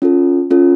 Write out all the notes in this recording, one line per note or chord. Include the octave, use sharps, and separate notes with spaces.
C#4 F4 A4
C#4 F4 A4